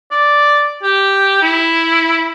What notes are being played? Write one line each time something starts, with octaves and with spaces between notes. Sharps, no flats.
D5
G4
E4